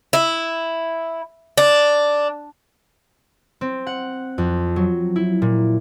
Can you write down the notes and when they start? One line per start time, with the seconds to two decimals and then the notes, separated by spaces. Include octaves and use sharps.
0.13 E4
1.58 D4
3.61 C4
3.87 F#5
4.38 F2
4.76 F#3
5.16 E4
5.42 A#2